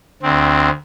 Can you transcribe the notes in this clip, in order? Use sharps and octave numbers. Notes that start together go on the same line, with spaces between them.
D2 C4